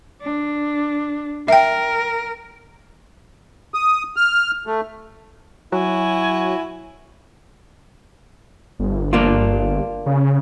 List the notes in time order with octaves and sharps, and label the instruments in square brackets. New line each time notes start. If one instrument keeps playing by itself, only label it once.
[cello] D4
[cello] A#4 [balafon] E5 G5
[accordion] D#6
F6
A3
[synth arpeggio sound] F#3 [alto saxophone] E4 [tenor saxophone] F#4 [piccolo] G#5
[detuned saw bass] G1
[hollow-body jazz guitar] A#3 D4 F4
[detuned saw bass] C#3